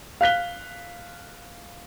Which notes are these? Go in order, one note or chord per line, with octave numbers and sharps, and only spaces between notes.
F5 F#6 B6 G7